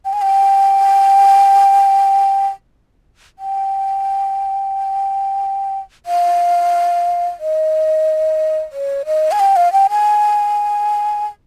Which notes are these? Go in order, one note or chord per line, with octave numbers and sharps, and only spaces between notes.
G5
G#5
G5
G5
F5
D#5
C#5
D#5
G#5
G5
F5
G5
G#5